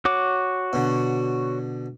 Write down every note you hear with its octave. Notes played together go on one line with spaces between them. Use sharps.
F#4 C#5 D6
B2 D3